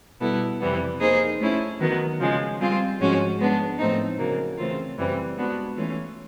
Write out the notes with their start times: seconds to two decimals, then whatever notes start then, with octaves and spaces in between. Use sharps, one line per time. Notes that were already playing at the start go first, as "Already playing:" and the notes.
0.21 B2 G3 B3 E4 A4
0.61 F2 C3 E3 G3 B3
1.01 A#3 D#4 G#4 C5
1.40 A3 C#4 E4
1.80 D#3 F#3 B3
2.20 C#3 F3 G#3
2.60 G3 C4 F4 G#4
3.00 G#2 F3 G#3 C#4 F#4
3.39 G#3 B3 D4
3.79 A2 F3 A3 C4 D#4
4.18 C#3 F#3 A#3
4.58 C#3 E3 A3 C4 F4
4.98 F#2 C#3 E3 G3 C4
5.38 G#3 B3 D4 F#4
5.77 E3 A3 C#4 F4